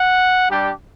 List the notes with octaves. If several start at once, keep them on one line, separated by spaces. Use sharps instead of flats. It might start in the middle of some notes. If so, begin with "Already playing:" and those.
Already playing: F#5
G3 D4 G4